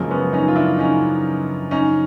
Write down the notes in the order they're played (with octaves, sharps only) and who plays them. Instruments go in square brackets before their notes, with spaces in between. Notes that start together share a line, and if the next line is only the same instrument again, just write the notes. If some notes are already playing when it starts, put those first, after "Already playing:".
Already playing: [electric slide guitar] F#2 C#3 F3 A#3 [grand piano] F#3 G#3
[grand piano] B3 C#4
C#4 D#4
F4
D4 E4
C#4 D#4
C#4 D#4